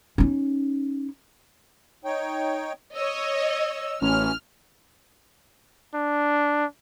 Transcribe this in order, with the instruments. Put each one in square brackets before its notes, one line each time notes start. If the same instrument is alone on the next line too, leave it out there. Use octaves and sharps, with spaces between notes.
[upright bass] C#4 D#4
[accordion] D#4 C#5 G5
[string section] C#5 D#5 [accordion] E6
[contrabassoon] A1 [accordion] E3 F#3 C#4 [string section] F6
[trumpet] D4